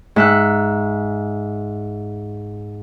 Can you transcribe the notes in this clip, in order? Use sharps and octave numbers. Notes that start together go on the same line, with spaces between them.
G#2 E5 F#6